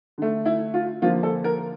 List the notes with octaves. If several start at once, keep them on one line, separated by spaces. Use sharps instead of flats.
D3 A3
E4
F4
D3 F3 A#3 F4
A4
A#4